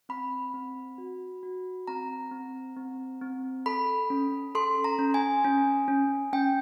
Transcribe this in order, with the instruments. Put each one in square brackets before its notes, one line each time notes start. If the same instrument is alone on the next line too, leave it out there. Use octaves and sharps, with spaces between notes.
[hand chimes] C4 B5
C4
F#4
F#4
C4 A#5
C4
C4
C4
A4 B5
C#4
A4 C6
A#5
C#4
G#5
C#4
C#4
C#4 G5